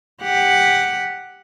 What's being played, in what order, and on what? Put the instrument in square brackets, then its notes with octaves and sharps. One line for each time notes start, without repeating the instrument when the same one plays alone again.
[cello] G4 F#5